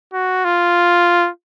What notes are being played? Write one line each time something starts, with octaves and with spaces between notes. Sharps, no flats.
F#4
F4